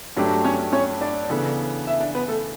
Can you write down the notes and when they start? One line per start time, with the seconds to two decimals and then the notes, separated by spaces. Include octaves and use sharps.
0.16 G2 F#3 A3 D4 G4
0.44 C#4 C#5
0.73 C#4 C#5
1.01 D4 D5
1.30 C#3 E3 B3 D4 A4
1.87 E5
2.00 D4 D5
2.15 B3 B4
2.28 A3 A4